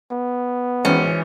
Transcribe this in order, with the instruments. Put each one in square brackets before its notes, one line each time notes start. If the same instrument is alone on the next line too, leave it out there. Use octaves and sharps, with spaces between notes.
[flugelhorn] B3
[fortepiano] G#1 G#2 [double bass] E3 [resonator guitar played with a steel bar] C#4